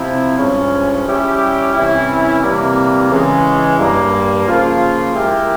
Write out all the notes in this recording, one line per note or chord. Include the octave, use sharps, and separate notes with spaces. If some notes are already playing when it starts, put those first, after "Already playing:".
Already playing: C3 F3 C4 E4
G2 F3 G#3 C#4
G3 C#4 E4 G4
C3 E3 G3 C#4 E4
C3 E3 G3 A#3
C#3 E3 G#3
G2 G3 A#3
C#3 F3 A#3 F4
G#3 E4 G4 A#4